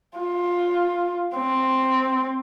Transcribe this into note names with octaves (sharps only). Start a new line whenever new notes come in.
F4
C4